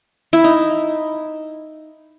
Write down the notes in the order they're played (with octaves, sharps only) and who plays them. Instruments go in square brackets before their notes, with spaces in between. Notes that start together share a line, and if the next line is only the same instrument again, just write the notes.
[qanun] E4
D#4